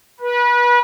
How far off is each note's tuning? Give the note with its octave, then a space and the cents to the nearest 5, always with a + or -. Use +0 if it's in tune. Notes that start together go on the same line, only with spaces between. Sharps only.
B4 -30